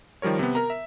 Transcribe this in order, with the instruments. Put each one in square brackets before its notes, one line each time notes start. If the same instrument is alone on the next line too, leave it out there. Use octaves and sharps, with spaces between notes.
[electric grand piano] D#3 F3 G3 A#4 C#5
C3 B3
A#4 A#5
E5